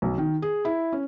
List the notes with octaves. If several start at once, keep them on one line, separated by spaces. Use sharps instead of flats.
B1
D#3
G#4
E4
C#4